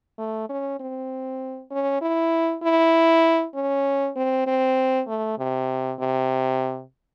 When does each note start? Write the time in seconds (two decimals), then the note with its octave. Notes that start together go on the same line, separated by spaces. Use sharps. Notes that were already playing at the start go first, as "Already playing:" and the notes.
0.18 A3
0.49 C#4
0.80 C4
1.71 C#4
2.02 E4
2.63 E4
3.54 C#4
4.16 C4
4.46 C4
5.07 A3
5.38 C3
6.00 C3